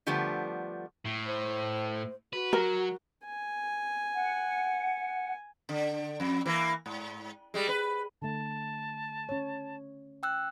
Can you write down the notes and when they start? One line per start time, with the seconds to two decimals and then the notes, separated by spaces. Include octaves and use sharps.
0.07 D3 F3 G3 A3 B3
1.06 A2
1.26 C5
2.33 F#4 B4
2.53 F#3 A#4
3.26 G#5
4.15 F#5
5.69 D3
6.20 F2
6.45 E3 A#3
6.86 G#2
7.54 G3 G#3
7.69 B4
8.22 D3 A3 A5
9.29 C#4 C#5
10.23 G5 E6 F#6